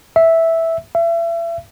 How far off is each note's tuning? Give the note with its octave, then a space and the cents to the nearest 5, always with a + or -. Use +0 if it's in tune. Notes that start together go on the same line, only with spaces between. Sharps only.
E5 -5
E5 +35